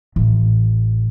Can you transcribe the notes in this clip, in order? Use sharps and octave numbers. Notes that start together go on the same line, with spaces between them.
A1